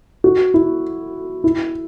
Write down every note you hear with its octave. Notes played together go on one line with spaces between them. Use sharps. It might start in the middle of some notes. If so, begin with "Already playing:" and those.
F#4
E4
E4